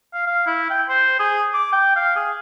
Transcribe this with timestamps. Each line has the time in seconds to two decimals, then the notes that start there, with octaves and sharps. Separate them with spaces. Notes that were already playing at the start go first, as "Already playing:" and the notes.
0.14 F5
0.27 F5
0.47 E4
0.70 G5
0.89 C5
1.20 G#4
1.54 D6
1.73 G5
1.96 F5
2.16 G#4